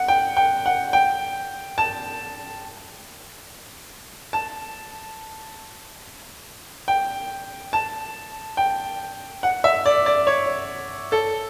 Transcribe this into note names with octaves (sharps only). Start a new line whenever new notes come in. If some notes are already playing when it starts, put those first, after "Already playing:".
Already playing: F#5
G5
G5
F#5
G5
A5
A5
G5
A5
G5
F#5
E5
D5
D5
C#5
A4